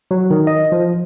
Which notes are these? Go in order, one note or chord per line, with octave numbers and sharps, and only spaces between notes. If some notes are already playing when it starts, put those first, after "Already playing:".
F#3
D#3
D#5
F3